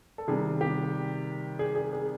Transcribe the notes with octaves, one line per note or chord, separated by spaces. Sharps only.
A4
C3 D#3 G3 G#4
G4
G#4
G#4
G#4